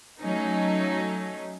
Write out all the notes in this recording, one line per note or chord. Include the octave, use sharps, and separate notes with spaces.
F#3 A3 C#4 D#4